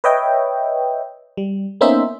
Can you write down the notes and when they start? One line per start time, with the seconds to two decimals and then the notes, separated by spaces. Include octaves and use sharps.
0.04 B4 C#5 D#5 E5 G5
1.37 G3
1.81 A#3 B3 C#4 D#4 C5 E5